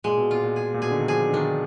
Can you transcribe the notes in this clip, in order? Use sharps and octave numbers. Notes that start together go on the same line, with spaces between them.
A#2 G#3
B2
A#2 F4
A#2
G#4
A#2
B2 G#4
D3
D#3
F3 G#4
D3
D#3 D4